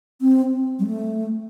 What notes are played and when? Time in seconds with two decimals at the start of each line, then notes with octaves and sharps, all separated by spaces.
0.21 C4
0.79 G3
0.87 A3